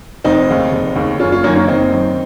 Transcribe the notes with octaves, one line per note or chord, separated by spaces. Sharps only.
F1 C4 D#4
D#2 C#3
F1
D#2 C#3
F#1 C#4 F4
C#4 F4
F#2 D#3 A#3 C#4
A#3 C#4
F#1 C4 D#4
F#2 D#3